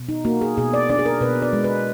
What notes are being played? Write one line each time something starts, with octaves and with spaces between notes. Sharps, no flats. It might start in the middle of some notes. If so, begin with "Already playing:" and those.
Already playing: B2
D#4
A#3 F#4
G#4
B2 G#4
D5
D4 D5
G#4
A#4
B2 B4
D5
G#3
B4